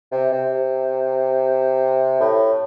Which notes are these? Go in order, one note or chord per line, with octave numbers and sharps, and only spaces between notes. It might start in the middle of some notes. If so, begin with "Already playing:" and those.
C3
C3
A2